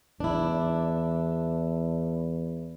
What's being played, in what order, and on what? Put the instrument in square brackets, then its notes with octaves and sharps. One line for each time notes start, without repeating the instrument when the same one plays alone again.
[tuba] E2 [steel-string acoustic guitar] D4 E4